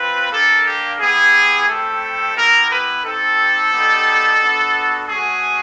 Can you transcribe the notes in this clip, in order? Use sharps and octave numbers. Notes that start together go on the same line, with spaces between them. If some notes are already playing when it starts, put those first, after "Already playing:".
Already playing: C4 F4 B4
A#3 D4 G4 A4
G4
B3 E4 G4 G#4
A3 C4 E4 G4 A4
B3 E4 G4 A#4
B4
C4 D#4 G4 A4
G3 B3 D#4 G4
B3 D4 F#4
A3 C#4 F#4 G#4